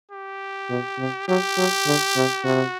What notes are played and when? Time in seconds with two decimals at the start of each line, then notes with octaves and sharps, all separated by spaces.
0.12 G4
0.69 B2
0.99 C3
1.28 F#3 G4
1.57 F#3
1.86 D3
2.16 C3
2.44 C3 F#4